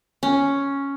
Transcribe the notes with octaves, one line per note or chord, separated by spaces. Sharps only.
C#4